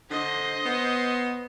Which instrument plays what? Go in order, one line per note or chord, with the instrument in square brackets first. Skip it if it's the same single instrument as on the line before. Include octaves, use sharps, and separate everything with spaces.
[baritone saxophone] D3 [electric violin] C5 D#5
[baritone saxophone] B3